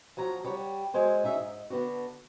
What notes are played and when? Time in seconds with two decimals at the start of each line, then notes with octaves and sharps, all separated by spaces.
0.17 F3 F#3 F#5 A#5
0.44 G3 C#5 F#5
0.94 F#3 G#3 C5 G#5
1.23 C#4 D#4 E5
1.37 G#2
1.70 D3 B3 D4 F#4